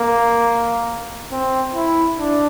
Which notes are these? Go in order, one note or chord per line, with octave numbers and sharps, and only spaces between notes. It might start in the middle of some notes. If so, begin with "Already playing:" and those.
Already playing: A#3
C4
E4
D4